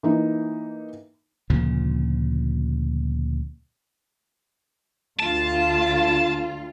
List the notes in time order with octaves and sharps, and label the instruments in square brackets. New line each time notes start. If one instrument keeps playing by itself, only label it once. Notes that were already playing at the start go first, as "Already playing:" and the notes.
[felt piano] E3 A#3 D#4
[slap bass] D2 A#2 C#3 F3
[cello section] D2 F4 [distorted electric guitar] A5